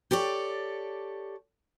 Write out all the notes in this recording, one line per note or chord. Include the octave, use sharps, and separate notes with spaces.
G4 A4 C#5 D5